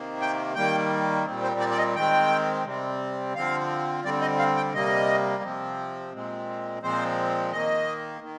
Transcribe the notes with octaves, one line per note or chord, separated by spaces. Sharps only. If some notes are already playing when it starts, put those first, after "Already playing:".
Already playing: C3 D#3 A#3
G5
D#3 G3 A#3 G5
A#2 G3 C4
C5
D5
D5
D#5
D#3 G#3 C4 G5
C3 G3 C4
D3 F3 C4 F5
D3 G3 C4 D5
D#5
F5
G5
C3 G3 A#3 D#5
C3 F3 C4
A#2 G#3 C4
A#2 F3 G#3 C4 C5
D#3 A#3 D#5
D#3